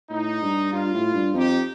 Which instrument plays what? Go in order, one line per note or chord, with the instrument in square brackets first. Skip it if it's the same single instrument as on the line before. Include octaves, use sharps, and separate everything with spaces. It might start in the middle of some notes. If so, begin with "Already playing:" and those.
[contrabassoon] A2 [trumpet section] D#4
[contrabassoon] G2
[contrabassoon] G2 [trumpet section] F4
[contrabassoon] A2
G2
[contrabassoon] F2 [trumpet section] D#4 G4